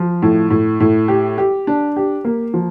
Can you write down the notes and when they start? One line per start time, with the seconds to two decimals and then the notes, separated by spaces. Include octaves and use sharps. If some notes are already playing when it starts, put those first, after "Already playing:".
Already playing: F3
0.22 A2
0.50 A2
0.80 A2
1.08 G4
1.38 G4
1.67 D4
1.96 G4
2.25 A#3
2.54 F3